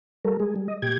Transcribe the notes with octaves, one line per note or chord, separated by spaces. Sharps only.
G3 A4 A#4
G#3 G#4
G3
D#5
A#2 G4 G5 G#6